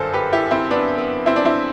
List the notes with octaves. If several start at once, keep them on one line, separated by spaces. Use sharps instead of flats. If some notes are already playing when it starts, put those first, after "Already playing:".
Already playing: G1 F#2 D3 A4 C5
G4 B4
E4 G4
C4 E4
B3 D4
B3
C4 E4
D4
C4 E4